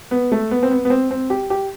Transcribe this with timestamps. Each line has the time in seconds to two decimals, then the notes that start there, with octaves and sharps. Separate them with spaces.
0.11 B3
0.32 A3
0.51 B3
0.63 C4
0.71 B3
0.85 B3
0.90 C4
1.11 C4
1.30 G4
1.50 G4